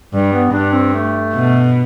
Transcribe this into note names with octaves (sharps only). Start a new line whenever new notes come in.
G2 G3
B3
G2 D4
C4
A3
B2